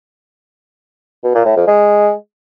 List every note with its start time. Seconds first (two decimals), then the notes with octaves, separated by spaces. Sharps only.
1.24 B2
1.35 A#2
1.46 A2
1.57 F2
1.68 G#3